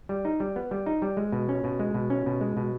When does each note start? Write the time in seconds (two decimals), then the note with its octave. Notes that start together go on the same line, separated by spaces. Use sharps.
0.09 G3
0.25 D#4
0.40 G3
0.56 B3
0.71 G3
0.86 D#4
1.02 G3
1.17 G#3
1.32 B2
1.49 C#4
1.64 B2
1.79 G#3
1.94 B2
2.10 C#4
2.26 B2
2.41 G#3
2.57 B2